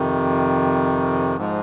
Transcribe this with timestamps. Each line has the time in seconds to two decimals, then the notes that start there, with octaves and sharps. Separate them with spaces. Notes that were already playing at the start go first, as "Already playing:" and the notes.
Already playing: F2 C3 D#3
1.37 G#2 F3 G#3